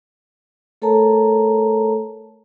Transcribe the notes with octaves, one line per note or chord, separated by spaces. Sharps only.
A3 A4 A#4 C#5 A5 A#5